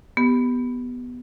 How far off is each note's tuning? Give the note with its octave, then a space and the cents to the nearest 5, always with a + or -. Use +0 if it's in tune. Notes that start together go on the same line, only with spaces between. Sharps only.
B3 +0 G4 +0